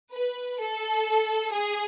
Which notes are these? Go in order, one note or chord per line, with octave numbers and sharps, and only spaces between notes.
B4
A4
G#4